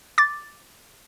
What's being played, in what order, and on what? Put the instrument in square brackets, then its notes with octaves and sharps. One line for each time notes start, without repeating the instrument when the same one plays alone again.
[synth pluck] D6 A6